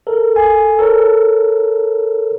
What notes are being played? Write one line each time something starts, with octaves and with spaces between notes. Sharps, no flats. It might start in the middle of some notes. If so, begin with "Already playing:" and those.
A4 A#4
A4 G#5
A4 A#4 C#5